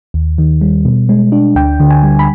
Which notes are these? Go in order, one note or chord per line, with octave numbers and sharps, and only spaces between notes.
D#2
D#3
G3
B2
G#3
D4
D2 G5
D3
G#5
G3
B5